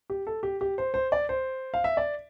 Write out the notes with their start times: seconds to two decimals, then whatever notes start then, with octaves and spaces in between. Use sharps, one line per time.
0.10 G4
0.27 A4
0.43 G4
0.61 G4
0.78 C5
0.94 C5
1.12 D5
1.29 C5
1.74 F5
1.84 E5
1.97 D5